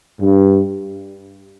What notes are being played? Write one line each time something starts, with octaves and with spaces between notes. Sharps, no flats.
G2